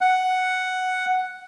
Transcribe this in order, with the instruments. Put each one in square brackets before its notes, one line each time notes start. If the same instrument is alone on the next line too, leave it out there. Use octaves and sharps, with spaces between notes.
[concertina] F#5